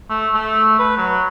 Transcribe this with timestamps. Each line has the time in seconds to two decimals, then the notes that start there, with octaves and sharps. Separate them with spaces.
0.10 A3
0.34 A3
0.79 B4
0.97 F#3